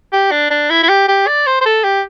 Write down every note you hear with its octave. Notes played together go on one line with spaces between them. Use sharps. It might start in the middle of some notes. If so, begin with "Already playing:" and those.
G4
D4
D4
E4
E4
G4
G4
D5
C5
C5
A4
G4